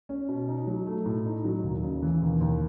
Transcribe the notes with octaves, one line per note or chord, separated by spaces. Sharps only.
C#4
B2
D#4
F#3
A3
A2
D#4
F#3
D#2
C#3
E3
D#2
D#2